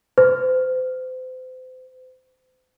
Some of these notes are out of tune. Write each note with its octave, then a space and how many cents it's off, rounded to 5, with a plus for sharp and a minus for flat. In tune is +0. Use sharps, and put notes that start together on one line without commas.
C5 -35